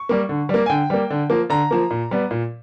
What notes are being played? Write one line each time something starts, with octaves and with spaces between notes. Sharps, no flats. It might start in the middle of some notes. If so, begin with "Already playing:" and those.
Already playing: C#6
G3 A#3
D3
G3 A#3
G#5
D3 G5
G3 A#3
D3
F3 A#3
D3 A#5
F3 A#3
A#2
G3 B3
A#2